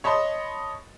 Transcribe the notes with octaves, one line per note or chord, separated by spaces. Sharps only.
C#5 D#5 A5 B5 C6